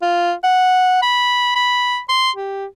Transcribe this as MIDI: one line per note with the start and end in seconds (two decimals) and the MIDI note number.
0.02 0.33 65
0.44 0.99 78
1.02 1.55 83
1.56 1.99 83
2.09 2.30 84
2.36 2.66 67